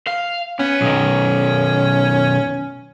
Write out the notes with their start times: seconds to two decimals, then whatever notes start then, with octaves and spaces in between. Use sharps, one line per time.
0.07 F5
0.59 B3 C#4
0.81 B1 D#3